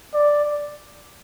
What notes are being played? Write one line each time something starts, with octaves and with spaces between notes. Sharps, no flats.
D5